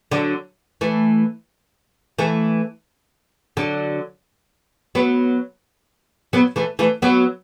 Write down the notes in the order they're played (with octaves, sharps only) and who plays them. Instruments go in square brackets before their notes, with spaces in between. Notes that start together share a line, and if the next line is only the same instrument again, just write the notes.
[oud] D3 F#3
E3 A3
E3 A3
D3 F#3
F#3 B3
F#3 B3
E3 A3
E3 A3
F#3 B3